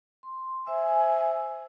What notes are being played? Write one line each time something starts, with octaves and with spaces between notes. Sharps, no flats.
C6
C5 E5 G#5 E6